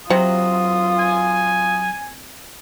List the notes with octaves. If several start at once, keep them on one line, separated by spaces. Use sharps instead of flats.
C3 F#3 F4 D#6
G#5